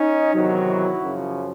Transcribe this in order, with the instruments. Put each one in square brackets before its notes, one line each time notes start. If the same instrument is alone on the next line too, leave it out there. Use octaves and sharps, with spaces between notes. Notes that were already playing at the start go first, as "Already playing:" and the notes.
Already playing: [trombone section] C#4 D#4
E2 C3 D#3 F#3
E4 F#4
F#2 C#3 F3